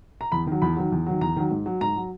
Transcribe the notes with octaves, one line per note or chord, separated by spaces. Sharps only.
A#5
E2 B5
D#3 F#3
E2 B5
D#3 F#3
E2
D#3 F#3
E2 A#5
D#3 F#3
G#2
F#3
G#2 A#5
F#3